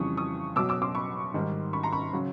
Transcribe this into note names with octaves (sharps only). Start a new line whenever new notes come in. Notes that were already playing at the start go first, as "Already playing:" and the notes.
Already playing: F2 C#3 E3 G3 C#6 D#6
C#6 D#6
B2 F#3 D6 E6
D6 E6
C6 D6
B5 C#6
G#2 D#3 G3
B5 C#6
A#5 C6
B5 C#6
C#3 F#3